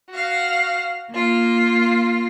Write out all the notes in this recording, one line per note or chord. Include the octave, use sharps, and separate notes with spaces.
F#4 F5
A#3 F4